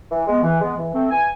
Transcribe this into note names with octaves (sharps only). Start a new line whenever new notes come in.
E3
G#3 B3
E3
G#3 B3
E3
A3 C4
E3 G#5